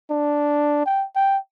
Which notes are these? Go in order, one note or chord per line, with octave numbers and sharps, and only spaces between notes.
D4
G5
G5